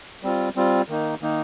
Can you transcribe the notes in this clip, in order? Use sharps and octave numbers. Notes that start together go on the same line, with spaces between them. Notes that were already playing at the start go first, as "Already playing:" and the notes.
G3 C4 F4
G3 C4 F4
D#3 A#3 D#4
D#3 A#3 D#4